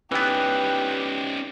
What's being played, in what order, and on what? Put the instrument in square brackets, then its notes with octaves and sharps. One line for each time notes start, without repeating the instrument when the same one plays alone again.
[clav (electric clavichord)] E3 B3 [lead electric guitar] C#4 D#4 [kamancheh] G4 [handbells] B4 G5 F#6